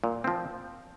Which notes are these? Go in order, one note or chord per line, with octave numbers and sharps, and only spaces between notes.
A#2
F3 C4